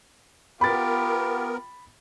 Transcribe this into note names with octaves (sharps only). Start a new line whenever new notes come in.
B3 F4 G4 A#4 B5 A6